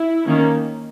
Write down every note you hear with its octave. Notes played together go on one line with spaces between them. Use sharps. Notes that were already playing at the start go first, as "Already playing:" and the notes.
Already playing: E4
D#3 A#3 C#4